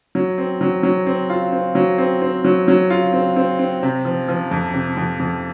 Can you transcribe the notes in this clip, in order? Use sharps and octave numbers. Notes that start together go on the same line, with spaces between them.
F#3
C4
F#3
F#3
C4
F4
C4
F#3
C4
C4
F#3
F#3
F4
C4
C4
C4
C3
F3
F3
F2
C3
F2
F2